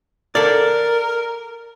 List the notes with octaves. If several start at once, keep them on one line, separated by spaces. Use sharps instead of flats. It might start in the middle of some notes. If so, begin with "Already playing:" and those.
A4 A#4 D5